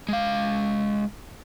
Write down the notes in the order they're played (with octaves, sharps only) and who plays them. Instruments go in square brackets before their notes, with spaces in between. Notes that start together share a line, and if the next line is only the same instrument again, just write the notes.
[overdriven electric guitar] G#3 F5